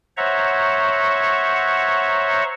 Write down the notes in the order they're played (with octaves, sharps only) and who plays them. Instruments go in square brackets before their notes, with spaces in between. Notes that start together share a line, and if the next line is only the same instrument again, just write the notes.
[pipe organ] C5 C#5 E5 F#5 A#5 C#6